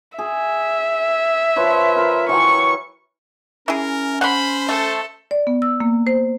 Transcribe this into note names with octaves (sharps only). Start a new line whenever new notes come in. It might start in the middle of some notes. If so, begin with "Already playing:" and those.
G#4 E5
F3 B4 C#5
F4 A#4
E3 F#3 G5 C#6
C#4 E4 G#4 A#4
C5 F#5 B5 C6
A3 A4
D5
B3
E6
A#3
C5